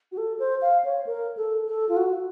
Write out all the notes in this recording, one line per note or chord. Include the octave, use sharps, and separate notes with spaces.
F#4
A4
C5
F5
C#5
A#4
A4
A4
F4
F#4